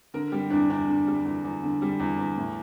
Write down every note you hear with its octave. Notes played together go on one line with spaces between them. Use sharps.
D3 A#4
G3 G4
E2 D4
E2 D4
D3
G3
E2
E2
D3
G3
E2
E2
A2